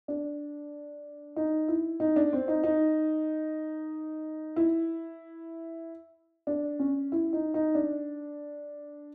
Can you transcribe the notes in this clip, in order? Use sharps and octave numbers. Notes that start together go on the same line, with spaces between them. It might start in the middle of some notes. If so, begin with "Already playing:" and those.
D4
D#4
E4
D#4
D4
C4
D#4
D#4
E4
D4
C#4
E4
D#4
D#4
D4